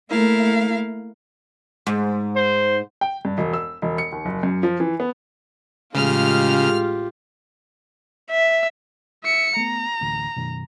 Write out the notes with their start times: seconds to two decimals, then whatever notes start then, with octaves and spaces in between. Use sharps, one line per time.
0.10 A3 A#3 E4 A#4 F5
1.87 G#2
2.36 C5
3.01 G5
3.25 G2
3.38 E1
3.53 E6
3.82 E1
3.98 C#7
4.12 D#2
4.25 F#1
4.43 F#2
4.63 F3
4.80 E3
5.00 B3
5.95 A1 C#3 G#3 F4 G4 F6
8.30 E5
9.24 E5 C#7
9.56 A3 B3 A#5
10.01 A1 D2
10.36 F#2 B2 D#3